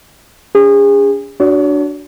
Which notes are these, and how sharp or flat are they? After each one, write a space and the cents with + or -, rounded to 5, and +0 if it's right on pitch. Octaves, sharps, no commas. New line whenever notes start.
C#4 +45 G#4 -35
D4 -5 F#4 +5 C#5 +40